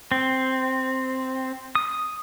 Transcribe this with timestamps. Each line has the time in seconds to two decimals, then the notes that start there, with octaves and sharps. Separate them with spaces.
0.12 C4
1.75 D#6